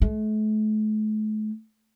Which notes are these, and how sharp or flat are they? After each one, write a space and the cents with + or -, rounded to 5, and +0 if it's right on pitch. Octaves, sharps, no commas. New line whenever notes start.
A3 -40